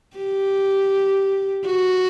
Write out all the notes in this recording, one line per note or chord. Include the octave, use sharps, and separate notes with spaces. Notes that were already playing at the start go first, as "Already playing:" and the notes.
G4
F#4